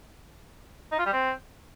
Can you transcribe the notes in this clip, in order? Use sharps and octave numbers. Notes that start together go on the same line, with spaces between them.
D#4
F4
G3
C4